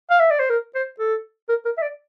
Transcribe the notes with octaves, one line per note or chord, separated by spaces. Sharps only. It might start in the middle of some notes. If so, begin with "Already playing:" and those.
F5
E5
D5
C5
A#4
C5
A4
A#4
A#4
E5
D5